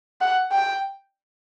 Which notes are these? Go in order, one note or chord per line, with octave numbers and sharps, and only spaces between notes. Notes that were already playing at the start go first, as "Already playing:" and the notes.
F#5
G5